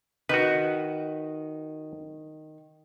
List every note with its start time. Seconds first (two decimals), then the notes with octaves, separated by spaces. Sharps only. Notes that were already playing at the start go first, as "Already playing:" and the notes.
0.29 D#3 F#4 B4